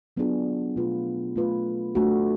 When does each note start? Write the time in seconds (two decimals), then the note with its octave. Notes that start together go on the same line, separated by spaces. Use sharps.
0.17 F#3 B3 D4 F4 G#4
0.76 B2 A3 D4 F4 B4
1.36 A3 F4 B4
1.95 A3 D4 F#4